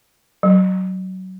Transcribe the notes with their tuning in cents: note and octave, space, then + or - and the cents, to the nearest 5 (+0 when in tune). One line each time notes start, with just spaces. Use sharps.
F#3 +15